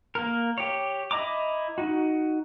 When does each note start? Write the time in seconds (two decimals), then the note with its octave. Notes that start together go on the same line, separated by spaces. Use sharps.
0.15 A#3 A#4
0.58 G4 C#5
1.11 E4 D#5 A#5 D6
1.78 D#4 F#4